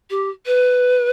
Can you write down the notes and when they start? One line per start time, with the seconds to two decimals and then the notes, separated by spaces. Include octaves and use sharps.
0.10 G4
0.46 B4